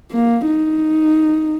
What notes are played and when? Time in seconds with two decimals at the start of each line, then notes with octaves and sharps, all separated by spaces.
0.12 A#3
0.46 D#4